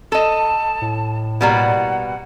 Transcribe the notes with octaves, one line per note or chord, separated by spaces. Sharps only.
A4 D#5 A5
A2
B2 G3 A#3 F#5